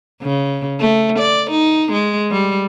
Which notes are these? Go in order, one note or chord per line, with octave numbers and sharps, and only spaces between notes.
C#3
A3
D5
D#4
G#3
G3